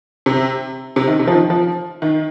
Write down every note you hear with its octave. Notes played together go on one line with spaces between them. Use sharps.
C3
C3
D#3
C3
F3
D#3
F3
D#3